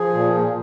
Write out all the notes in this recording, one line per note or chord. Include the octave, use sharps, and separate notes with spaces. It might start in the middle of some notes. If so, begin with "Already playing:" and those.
Already playing: F3 G#4
A#2
A#2